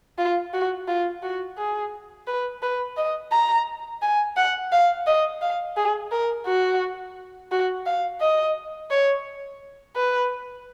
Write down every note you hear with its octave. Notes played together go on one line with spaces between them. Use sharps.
F4
F#4
F4
F#4
G#4
B4
B4
D#5
A#5
G#5
F#5
F5
D#5
F5
G#4
A#4
F#4
F#4
F5
D#5
C#5
B4